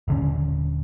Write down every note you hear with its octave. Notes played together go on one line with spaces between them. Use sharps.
D#1 D3 C#4